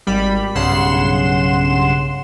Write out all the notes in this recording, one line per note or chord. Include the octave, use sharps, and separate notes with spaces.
G#1 G3 B5
B1 G2 C#3 F#5 C6 E7